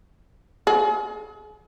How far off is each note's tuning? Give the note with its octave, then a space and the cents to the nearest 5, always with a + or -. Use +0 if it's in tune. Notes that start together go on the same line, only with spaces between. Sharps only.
G#4 +40